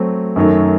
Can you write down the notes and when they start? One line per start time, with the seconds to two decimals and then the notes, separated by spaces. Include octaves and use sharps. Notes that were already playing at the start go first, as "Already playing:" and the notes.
Already playing: F#3 A3 C4
0.36 F#2 D#3 F#3 A3